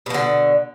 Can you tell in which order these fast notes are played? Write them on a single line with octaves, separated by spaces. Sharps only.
B2 F3 D3